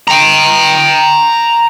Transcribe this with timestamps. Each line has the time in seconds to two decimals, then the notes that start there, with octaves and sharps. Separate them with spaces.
0.08 G5 A#5